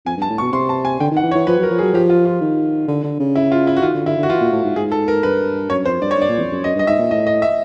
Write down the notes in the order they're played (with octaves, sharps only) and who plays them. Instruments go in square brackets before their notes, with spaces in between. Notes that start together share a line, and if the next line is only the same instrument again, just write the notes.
[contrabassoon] F2 [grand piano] G#5
[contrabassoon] G2 [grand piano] A5
[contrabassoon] A2
[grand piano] C#6
[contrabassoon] B2
[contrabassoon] C3 [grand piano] C6
[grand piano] A5
G#5
[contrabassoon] D3 [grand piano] G5
[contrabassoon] D#3
[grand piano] F#5
[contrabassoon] E3
[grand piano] C#5
[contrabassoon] E3
[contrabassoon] F3 [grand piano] B4
[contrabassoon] F#3 [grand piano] A#4
[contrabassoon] F3
[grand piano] G#4
[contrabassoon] F#3
[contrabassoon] F3 [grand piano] G4
[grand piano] F4
F4
[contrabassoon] D#3
D3
D3
C#3
[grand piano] E4
F4
E4
F#4
[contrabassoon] D#3 [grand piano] F4
[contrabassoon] D3
[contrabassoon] D3 [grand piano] E4
[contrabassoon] D3
[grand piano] F#4
[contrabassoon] E3 [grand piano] F4
[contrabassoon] A#2
A2
G#2
[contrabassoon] G#2 [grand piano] G#4
[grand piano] A4
A#4
[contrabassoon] G2 [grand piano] B4
[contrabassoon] F#2 [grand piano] C#5
[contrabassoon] F2 [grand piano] C5
[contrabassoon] G2 [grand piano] D5
[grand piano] C#5
[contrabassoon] G2 [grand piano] D5
[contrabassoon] A#2
E2
F2
F#2
[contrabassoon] F#2 [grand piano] D#5
[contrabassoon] G2 [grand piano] D#5
[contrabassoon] G#2 [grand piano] E5
[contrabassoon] A#2
[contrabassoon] A2 [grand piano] D#5
[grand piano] D#5
E5